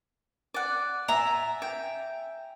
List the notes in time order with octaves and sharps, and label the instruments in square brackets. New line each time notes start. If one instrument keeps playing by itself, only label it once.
[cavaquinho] D5 F#5
[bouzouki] E5 G#5 A#5
[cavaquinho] G5